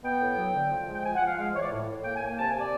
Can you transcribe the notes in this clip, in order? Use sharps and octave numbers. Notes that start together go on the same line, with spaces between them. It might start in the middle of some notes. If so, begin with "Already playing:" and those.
B3 G5
A2
F#3
D3
F3
G#3
G5
F3 G#5
F#5
F3 F5
G#3 F5
E3 C#5
D5
A2
A2
A#3 G5
G#5
A#3
G#5
C3 A5
G#5
C3
D5